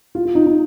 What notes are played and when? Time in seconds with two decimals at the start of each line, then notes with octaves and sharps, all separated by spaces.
0.15 F4
0.25 F4
0.35 D#4
0.46 D#4